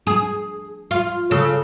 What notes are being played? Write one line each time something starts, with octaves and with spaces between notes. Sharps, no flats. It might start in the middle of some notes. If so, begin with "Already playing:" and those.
G#4
F4
C#3 A4